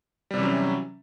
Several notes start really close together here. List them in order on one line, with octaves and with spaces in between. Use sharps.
G3 C3 E3 C#4 F#3